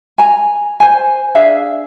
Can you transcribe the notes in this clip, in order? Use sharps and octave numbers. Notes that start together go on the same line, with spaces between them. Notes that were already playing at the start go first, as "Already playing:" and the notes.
G#5 A#5
C5 G#5
D4 G#4 E5 F5